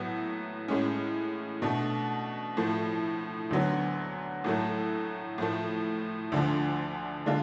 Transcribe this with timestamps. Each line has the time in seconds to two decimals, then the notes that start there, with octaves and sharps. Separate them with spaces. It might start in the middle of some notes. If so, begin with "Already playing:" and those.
Already playing: A2 F#3 B3
0.68 A2 G#3 C#4
1.62 B2 A3 D4
2.57 A2 F3 A3
3.50 D2 D3 F#3 B3
4.44 A2 F#3 A3
5.38 A2 F3 A3
6.32 D2 D3 F3
7.26 D3 G#3 D4 F4